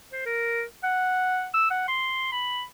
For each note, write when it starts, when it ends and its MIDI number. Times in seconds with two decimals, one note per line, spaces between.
0.12 0.22 72
0.26 0.63 70
0.84 1.48 78
1.54 1.69 88
1.70 1.85 78
1.88 2.30 84
2.32 2.63 83